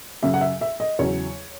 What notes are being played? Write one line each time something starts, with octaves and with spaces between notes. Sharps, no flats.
F#2 C#3 F#3 E5
F#5
E5
E5
D#5
E2 C#3 F#3 C#5